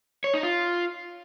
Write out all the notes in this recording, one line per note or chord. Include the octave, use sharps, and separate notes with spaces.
C#5
D#4
F4